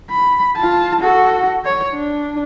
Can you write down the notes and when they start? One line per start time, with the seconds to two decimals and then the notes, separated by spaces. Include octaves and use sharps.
0.11 B5
0.57 F4 A5
1.01 F#4 A4
1.65 C#5
1.94 D4